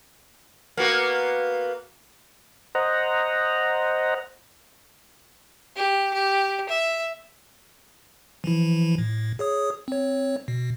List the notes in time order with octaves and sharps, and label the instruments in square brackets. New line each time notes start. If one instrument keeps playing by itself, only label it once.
[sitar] A#3 B3 F#4
[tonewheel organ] C5 D#5 F#5 A#5
[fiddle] G4
G4
E5
[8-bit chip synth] E3 F3 E4
A2
G#4 C#5 D#6
C4 C#5
B2